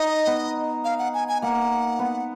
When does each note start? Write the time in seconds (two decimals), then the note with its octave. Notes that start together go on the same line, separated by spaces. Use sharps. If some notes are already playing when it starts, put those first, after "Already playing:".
Already playing: D#4 D#5
0.27 B3
0.84 F5
0.99 F#5
1.14 G#5
1.28 G#5
1.42 A#3 F#5
1.99 B3